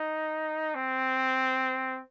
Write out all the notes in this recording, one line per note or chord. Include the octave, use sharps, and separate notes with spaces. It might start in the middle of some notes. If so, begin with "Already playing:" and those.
Already playing: D#4
C4